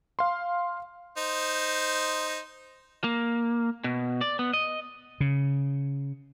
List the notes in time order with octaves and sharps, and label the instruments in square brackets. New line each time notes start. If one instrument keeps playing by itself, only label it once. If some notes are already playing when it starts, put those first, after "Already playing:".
[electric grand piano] F5 C6
[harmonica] D#4 C5
[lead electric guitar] A#3
B2
D5
B3
D#5
[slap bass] C#3